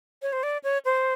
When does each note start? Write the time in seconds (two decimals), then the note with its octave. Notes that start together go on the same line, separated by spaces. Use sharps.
0.22 C#5
0.33 C5
0.43 D5
0.64 C#5
0.85 C5